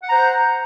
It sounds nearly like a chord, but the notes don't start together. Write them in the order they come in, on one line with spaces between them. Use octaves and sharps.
F#5 A#5 C5